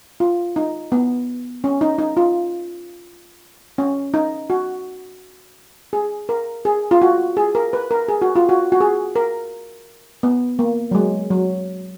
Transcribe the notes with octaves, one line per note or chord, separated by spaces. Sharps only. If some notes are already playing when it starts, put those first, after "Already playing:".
F4
D#4
B3
C#4
D#4
D#4
F4
C#4
D#4
F#4
G#4
A#4
G#4
F4
F#4
G#4
A#4
B4
A#4
G#4
F#4
F4
F#4
F#4
G#4
A#4
B3
A#3
F#3
G#3
F#3